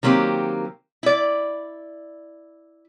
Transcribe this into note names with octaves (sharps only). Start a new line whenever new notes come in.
D#3 F#3 A#3 C4 G4
E4 D5